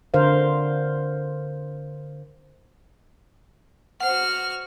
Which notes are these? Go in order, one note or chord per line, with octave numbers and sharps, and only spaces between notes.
D3 A#4 C5 F5
F#4 C5 F#5 F6